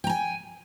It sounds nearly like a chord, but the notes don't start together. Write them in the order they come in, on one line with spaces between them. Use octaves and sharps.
G5 A#5 G#5